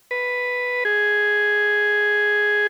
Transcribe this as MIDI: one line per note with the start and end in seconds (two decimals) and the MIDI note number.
0.11 0.84 71
0.85 2.67 68